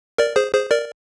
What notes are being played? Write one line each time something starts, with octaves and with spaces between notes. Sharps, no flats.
A#4 D5
G#4 C5
G#4 C5
A#4 D5